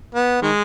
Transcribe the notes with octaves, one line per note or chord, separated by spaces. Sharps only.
B3
D#3 G#3